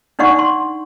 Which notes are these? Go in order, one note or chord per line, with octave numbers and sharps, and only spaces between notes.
D4 D#4 D5 F#5 C#6
C6